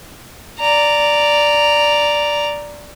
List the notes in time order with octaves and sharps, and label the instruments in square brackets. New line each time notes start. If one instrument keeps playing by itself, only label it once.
[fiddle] D5 A#5